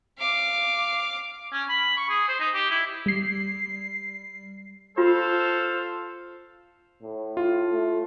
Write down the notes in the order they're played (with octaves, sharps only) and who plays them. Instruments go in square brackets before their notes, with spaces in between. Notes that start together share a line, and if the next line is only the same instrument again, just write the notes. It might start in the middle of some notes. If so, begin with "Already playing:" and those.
[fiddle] F5 D6
[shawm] C#4
B5
C#6
G#4
C5
D#4
G4
E4
[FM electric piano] G3 C7
[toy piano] F4 [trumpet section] A4 C5 F5
[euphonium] A2
[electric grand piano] F4
[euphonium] A3